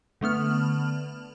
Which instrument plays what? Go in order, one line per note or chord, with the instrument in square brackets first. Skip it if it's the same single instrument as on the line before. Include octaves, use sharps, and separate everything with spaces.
[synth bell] D3 A3 B3 F6